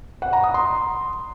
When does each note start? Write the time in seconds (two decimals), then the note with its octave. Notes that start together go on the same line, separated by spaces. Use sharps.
0.22 F#5
0.33 A#5
0.44 D#6
0.54 C6